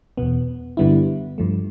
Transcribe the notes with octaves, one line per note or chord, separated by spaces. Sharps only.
E2 B2 B3
G2 D3 G3 B3 E4
G2 F3 A3